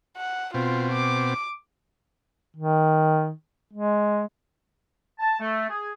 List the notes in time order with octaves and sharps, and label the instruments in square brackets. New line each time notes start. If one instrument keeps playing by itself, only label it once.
[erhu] F#5
[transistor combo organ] B2 C4 [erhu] F4
[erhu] D6
[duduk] D#3
G#3
[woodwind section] A5
A3
G#4